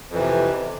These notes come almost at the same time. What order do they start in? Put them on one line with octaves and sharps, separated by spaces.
F2 E3 C3